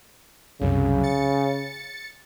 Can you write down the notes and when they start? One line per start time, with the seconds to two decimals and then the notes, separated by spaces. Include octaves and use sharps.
0.61 C2 F#2 C#3
1.03 A6 C#7